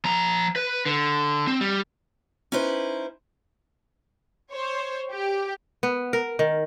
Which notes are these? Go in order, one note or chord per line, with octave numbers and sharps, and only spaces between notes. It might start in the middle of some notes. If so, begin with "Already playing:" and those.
F3 A#5
B4
D3
C4
G3
C#4 D#4 E4 B4 C5
C5 C#5
G4
B3
A#4
D#3